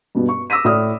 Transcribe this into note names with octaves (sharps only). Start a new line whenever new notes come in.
G2 B2
C#6
D6 E6 A#6 B6 D#7
A2 D5 D#6 F6